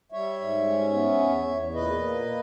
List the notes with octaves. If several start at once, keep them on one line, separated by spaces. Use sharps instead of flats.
G3 C#5 E5
G#2
C#4
B3
E2
E2
A#2 B4 D#5
A#3